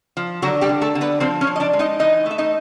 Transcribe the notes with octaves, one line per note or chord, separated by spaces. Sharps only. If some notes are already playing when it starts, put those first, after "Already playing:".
F3
D3 F#3 F#4
G3 G4
D3
A3 A4
D3
B3 B4
F3 C4 C5
C#4 C#5
F3
D#5
D4 D5
G#3
D#4 D#5
E3 D#4 D#5
A3 E5
D#4 D#5